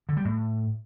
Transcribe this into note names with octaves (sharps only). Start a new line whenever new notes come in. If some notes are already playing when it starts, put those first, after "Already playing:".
D3
G3
A2